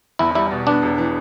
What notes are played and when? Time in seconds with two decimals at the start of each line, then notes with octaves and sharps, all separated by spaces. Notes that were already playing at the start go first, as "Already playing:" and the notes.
0.19 E2 E4
0.35 G3 E4
0.51 B2
0.67 B3 D4
0.82 E1
0.98 E3